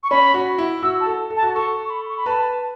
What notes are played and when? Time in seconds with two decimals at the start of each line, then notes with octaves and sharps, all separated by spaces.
0.03 C#6
0.11 C#4 B5
0.34 F#4
0.58 E4
0.83 F#4 E6
1.00 A5
1.06 A4
1.30 A4
1.37 A5
1.43 F#4
1.55 A4 C#6
1.85 C#6
1.90 B5
2.09 C#6
2.17 B5
2.26 B4 A5